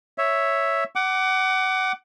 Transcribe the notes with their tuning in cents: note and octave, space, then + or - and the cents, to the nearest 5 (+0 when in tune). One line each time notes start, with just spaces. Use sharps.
C#5 +0 E5 +0
F#5 +25 D6 +0